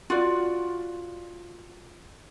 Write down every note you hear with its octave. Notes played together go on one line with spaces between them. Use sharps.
F4 F#4 D5